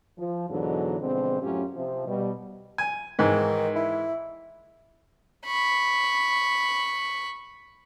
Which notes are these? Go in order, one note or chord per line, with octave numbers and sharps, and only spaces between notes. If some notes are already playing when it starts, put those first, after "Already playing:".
F3
E2 G#2 B2 D3 E3 F#3
B2 D3 F3 G#3 C4
F#2 A2 F#3 C#4 F4 G4
C3 F3
B2 G3
G#5
G#2 D#3 E3
E4
B5 C#6